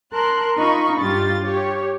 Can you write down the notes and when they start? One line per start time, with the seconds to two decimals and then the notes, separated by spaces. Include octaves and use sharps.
0.12 A#4 A5 C6 F#6
0.57 D#4 F4 B5 C#6
0.99 G2 F4 G4 A6
1.43 G4 C#5